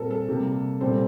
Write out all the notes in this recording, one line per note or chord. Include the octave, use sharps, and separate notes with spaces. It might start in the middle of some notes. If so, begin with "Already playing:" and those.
Already playing: A#2 G3 C4 A4 A#4
A4
C3 G3 A#3
A#2 G3 C4 A4 C5